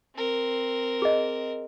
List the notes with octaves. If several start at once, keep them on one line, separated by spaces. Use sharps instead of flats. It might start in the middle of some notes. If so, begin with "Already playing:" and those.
C4 A#4
G#4 D#5